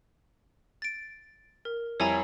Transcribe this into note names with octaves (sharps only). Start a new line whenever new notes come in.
A6 D7
A#4
F2 G3 E4 C#5 G#5 A#5